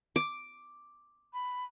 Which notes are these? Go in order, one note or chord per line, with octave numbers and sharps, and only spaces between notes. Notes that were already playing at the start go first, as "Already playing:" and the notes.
D6
B5